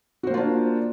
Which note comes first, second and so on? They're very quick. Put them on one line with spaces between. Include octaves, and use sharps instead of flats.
F#4 C5 A#3 F4 D4